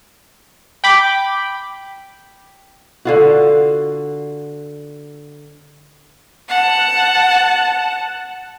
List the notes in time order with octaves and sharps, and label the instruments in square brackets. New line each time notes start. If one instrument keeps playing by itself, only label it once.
[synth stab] G5 B5 D6
[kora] D3 F4 F#4
[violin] F#5 A5